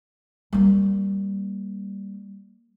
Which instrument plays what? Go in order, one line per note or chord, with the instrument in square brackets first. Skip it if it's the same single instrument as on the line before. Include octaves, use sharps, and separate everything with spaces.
[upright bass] G3 A#3